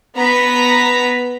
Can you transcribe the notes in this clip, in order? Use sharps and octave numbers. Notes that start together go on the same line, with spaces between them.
B3 A#5 B6